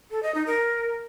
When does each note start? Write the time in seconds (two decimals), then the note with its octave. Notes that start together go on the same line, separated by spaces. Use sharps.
0.11 A4
0.23 D#5
0.35 D#4
0.47 A#4